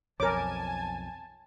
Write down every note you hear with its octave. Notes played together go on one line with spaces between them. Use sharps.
B1 F2 A#4 C#5 G#5 A5 D6